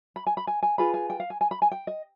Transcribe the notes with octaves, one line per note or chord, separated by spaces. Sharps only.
B5
G#5
B5
G#5
G#5
F4 G#4 B4 B5
G#5
G5
F5
G#5
G#5
B5
G#5
G5
D#5